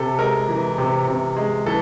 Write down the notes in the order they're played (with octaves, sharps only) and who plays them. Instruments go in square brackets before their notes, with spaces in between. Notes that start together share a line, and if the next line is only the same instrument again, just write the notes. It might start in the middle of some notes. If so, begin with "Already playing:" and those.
Already playing: [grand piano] C3 A4
G#3 A#4
E3
C3
C3
G#3
E3 A4